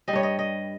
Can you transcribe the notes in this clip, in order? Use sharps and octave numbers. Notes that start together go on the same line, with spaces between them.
G3 D#5
G2 C#5
D#5
D#5